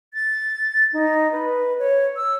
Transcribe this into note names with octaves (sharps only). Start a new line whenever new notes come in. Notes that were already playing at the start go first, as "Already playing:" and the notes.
A6
D#4
B4
C#5
E6